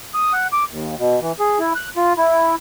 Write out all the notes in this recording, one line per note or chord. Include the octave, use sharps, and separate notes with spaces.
D#6
F#5
D6
D#2
B2
E3
G#4
E4
F#6
F4
E4